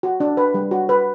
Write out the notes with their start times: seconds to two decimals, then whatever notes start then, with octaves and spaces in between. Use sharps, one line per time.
0.03 F#4
0.20 D4
0.37 B4
0.54 G3
0.71 F#4
0.89 B4